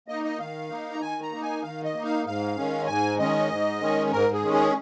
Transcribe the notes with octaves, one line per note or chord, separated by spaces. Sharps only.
A#3 D#4 D#5
D#5
D#3 F5
A#3 D#4
A#5
D#3 G#5
A#5
A#3 D#4
G#5
D#3 F5
D#5
A#3 D#4
F5
G#2 F5
D#3 G#3 C#4
G#2 G#5
D#3 G#3 C#4 D#5
G#2
D#3 G#3 C#4
G#2 A#4
G#4
D#3 G#3 C#4
G#4